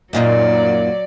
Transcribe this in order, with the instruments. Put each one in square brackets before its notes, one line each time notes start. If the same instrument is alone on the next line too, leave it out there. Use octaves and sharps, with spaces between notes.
[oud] F#2 A#2 D#4 [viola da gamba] F#3 D5